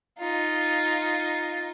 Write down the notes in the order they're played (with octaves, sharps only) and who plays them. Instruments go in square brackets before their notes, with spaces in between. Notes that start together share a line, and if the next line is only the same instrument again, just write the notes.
[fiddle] D#4 F4